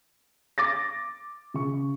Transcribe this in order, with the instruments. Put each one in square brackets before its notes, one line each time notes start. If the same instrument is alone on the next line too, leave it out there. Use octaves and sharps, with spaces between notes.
[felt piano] D6 A6 A#6
[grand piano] C#3 C#6